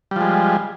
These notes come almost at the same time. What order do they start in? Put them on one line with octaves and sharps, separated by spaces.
G3 F3 G#3